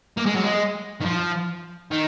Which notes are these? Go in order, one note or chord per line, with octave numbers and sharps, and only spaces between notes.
A#3
G#3
F#3
G#3
D#3
F3
D#3